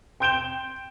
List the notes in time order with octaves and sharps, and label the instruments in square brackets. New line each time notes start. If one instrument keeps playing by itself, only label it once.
[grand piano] G5 C6 G6 D7 E7 G7